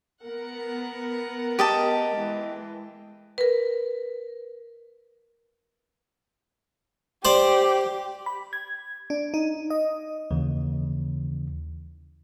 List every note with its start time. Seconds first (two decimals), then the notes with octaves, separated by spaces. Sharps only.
0.24 B3 A#4 F#5
1.59 G4 D#5 A5
2.15 E3 G#3
3.38 A#4 B4
7.25 G4 C5 D5
8.26 B5
8.53 G#6
9.10 D4
9.34 D#4
9.70 D#5
10.31 D#2 C#3 E3